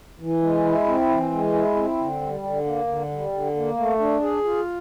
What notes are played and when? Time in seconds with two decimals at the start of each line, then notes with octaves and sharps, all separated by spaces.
0.20 E3
0.42 G#3
0.65 E4
0.87 C4
1.09 E3
1.32 G#3
1.54 E4
1.76 C4
1.98 D3
2.21 G3
2.43 D3
2.65 A#3
2.87 D3
3.11 G3
3.33 D3
3.55 A#3
3.78 A3
3.99 D4
4.21 G#4
4.44 F4